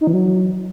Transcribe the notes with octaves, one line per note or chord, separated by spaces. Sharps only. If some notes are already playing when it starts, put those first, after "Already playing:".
D#4
E3
F#3